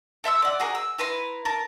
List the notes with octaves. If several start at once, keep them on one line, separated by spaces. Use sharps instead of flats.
A4 E5 C6 E6
D5 F#5
F#4 G#4 A#4
E6
E4 B4 A#5 C6
A#4 A5